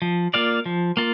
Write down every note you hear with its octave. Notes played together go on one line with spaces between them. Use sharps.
F3
A#3 F4 D5 F5
F3
A#3 F4